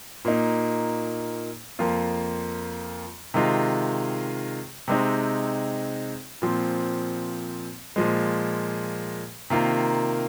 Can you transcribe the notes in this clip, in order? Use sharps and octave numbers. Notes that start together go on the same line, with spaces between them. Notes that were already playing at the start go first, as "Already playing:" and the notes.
A#2 A#3 D#4
F2 F3 A#3 F4
C3 D#3 G#3 F4
C3 G#3 C4 D#4
A#2 F3 C4
A#2 F3 G#3
C3 D#3 A#3 F4